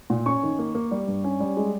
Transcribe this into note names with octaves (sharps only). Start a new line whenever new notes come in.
A#2
C#4 C#6
D#3
A#3
A#3
G3
G2
C#4
G3
G#3